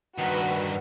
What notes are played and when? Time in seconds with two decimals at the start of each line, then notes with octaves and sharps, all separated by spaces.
0.18 G2 D#3 F#4 B4